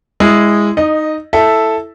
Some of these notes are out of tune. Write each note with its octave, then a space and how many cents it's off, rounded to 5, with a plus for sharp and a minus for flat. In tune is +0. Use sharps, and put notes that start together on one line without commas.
G#3 -10 E4 +0
D#4 +0 D#5 -20
E4 +0 A4 +0 E5 +0